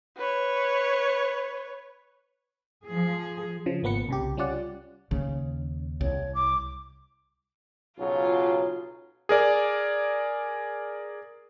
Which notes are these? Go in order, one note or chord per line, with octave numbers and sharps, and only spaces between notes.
B4 C#5
F3 G#4
C#3 F3
G#1 A#3 B3 B4 C#7
C2 C#3 G4
G3 C#4 F4 D5 F#5
D#2 C#3
C2 C#5
D6
B1 C#3 F#3 F4
G#4 A#4 D5